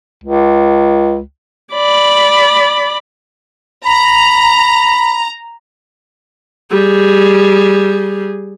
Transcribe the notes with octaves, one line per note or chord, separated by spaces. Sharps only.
C#2
D5 B5
A#5 B5
G3 G#4